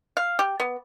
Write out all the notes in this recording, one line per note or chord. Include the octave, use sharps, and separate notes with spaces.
F5
G4
B3